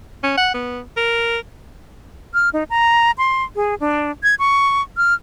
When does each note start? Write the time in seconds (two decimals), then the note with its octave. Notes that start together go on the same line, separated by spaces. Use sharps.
0.23 C#4
0.37 F#5
0.54 B3
0.97 A#4
2.34 F6
2.53 D#4
2.70 A#5
3.18 C6
3.56 G#4
3.80 D4
4.23 G#6
4.39 C#6
4.97 F6